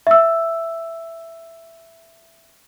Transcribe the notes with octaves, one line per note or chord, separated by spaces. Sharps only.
E5 E6